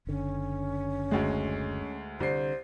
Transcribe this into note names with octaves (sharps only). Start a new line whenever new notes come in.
F#1 D3 C#4
D2 G#3
C2 D3 C5 C7